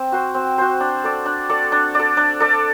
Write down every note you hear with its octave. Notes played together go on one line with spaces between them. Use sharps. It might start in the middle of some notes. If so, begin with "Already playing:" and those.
Already playing: C4
F#4 C5
C4
F#4 C5
D4
A4 D5
D4
A4 D5
D4
A4 D5
D4
A4 D5